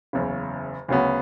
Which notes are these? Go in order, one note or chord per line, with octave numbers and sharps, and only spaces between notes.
F#1 E2 C#3
D2 C#3 F#3 B3